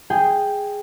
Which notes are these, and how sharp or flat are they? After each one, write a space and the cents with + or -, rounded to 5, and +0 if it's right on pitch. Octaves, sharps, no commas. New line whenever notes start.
G#4 -5 G5 +5